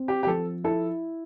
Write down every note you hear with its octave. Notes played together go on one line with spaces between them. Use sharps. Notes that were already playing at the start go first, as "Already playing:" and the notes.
Already playing: C4
G4
G4
F3 A4
E4 A4